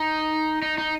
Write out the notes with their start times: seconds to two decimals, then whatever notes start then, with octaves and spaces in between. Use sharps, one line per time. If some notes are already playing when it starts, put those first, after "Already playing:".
Already playing: D#4
0.62 D#4
0.78 D#4